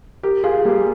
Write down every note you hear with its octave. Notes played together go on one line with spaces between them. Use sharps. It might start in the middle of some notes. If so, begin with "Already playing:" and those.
G4 A#4
F4 G#4
G3 A#3